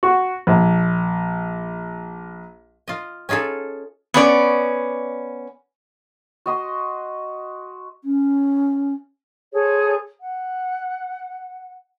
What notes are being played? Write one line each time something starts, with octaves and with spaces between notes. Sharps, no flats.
F#4
A#1
F4 D#5
C#4 D#4 F4 G#4 A4
B3 C#4 D5
F#4 D#5 C6
C#4
G#4 A4 C5 C#5
F#5